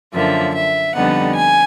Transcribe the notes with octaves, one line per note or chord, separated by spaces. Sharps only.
F#2 D3 F3 A#3 E5
E5
F2 D3 G3 B3 D#4 F#5
G#5